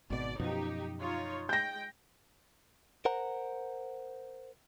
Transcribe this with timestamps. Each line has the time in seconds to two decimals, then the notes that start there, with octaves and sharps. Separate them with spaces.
0.10 G#1 B2 D5
0.39 F#2 B2 F3 D#4 G4
1.00 D#4 F4 C#5
1.49 G#3 G5 G6 A#6
3.05 A#4 C5 F#5 A#5